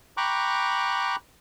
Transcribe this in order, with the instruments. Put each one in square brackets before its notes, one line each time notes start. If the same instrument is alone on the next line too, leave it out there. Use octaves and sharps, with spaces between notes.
[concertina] G5 A#5 B5 C#6 D6 F#6